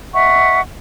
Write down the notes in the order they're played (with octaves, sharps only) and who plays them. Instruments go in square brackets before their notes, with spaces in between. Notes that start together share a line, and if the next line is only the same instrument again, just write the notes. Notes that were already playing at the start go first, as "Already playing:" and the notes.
[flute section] D#5 E5 F#5 C#6